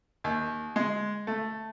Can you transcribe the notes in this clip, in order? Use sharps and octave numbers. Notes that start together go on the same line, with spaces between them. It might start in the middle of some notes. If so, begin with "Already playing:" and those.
D#2
G#3
A3